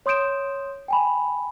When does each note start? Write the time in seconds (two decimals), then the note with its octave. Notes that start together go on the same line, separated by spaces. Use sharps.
0.06 C#5 C6 D#6 G6 D7 E7
0.88 G5 G#5 B5